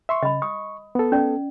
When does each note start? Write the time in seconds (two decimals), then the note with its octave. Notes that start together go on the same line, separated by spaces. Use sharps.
0.09 E5 C6 C#6
0.23 C#3 D#5 B5
0.42 C#6 D#6
0.95 B3 A4
1.12 C#4 D5